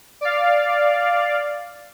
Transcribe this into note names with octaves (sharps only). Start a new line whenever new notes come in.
D5 F5